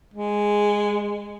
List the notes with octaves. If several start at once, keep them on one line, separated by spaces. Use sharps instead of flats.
G#3